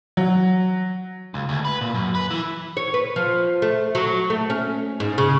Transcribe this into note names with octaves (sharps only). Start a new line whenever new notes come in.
F#3
C#2
D2
B4
A#2
F#2
B4
E3
C#5
B4
F3
A3
F#3
A3
C#4
G#2
C#3